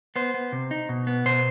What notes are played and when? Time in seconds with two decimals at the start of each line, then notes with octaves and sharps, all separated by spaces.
0.16 B3 C5
0.34 B3
0.52 C3
0.71 D#4
0.89 B2
1.07 B3
1.26 B2 C5